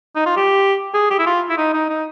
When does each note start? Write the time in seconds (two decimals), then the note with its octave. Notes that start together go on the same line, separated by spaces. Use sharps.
0.16 D#4
0.26 F4
0.36 G4
0.94 G#4
1.11 G4
1.19 E4
1.26 F4
1.50 E4
1.58 D#4
1.73 D#4
1.89 D#4